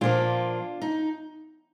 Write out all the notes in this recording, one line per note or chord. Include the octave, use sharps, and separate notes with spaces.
A#2 F3 A#3 D4 F4
D#4